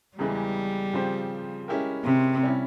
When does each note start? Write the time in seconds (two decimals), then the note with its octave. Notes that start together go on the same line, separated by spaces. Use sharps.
0.18 E2 C#3 E3 G3 G#3
0.93 C#3 F3 C4 G4 C5
1.68 G#3 C#4 E4 G4 A#4
2.05 C3
2.43 G3 C#4 E4